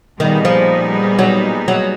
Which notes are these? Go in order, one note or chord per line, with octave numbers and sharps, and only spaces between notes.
A#2 D#3 G3 B3 D#4 G#4
F3
F#3
F#3